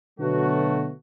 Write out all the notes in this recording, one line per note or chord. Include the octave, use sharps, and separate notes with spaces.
B2 D3 F#3 A3 B3 F#4